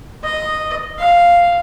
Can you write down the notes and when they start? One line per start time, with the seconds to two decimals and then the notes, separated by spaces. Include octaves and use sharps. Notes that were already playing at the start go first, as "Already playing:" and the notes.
0.24 D#5
0.98 F5